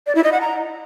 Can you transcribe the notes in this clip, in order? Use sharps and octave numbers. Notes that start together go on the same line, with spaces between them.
D5
E4
D#5
F#5
A#5